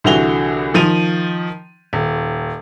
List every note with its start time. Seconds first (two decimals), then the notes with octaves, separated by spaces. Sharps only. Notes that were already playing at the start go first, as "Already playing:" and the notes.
0.04 C2 D3 E3 F#4 F7 G7
0.74 D#3 F3 D#7 F7
1.93 D#1